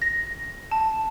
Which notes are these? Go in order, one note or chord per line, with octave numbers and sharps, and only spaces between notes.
A#6
A5